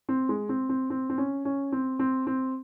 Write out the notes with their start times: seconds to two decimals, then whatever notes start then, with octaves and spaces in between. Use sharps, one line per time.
0.09 C4
0.29 G#3
0.49 C4
0.69 C4
0.90 C4
1.10 C4
1.18 C#4
1.45 C#4
1.72 C4
1.99 C4
2.27 C4